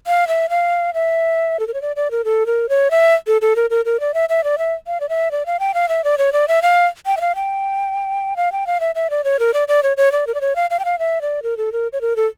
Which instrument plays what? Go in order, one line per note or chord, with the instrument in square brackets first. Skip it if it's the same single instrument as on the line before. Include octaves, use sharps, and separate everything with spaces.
[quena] F5
E5
F5
E5
A4
A#4
C#5
D5
D5
A#4
A4
A#4
C#5
E5
A4
A4
A#4
A#4
A#4
D5
E5
E5
D5
E5
F5
D5
E5
D5
F5
G5
F5
E5
D5
C#5
D5
E5
F5
G5
E5
F5
G5
F5
G5
F5
E5
E5
D5
C#5
A#4
D5
D5
C#5
C#5
D5
A#4
D5
C#5
F5
F5
G5
F5
E5
D5
A#4
A4
A#4
C#5
A#4
A4